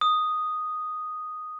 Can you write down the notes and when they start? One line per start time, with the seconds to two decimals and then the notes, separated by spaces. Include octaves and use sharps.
0.01 D#6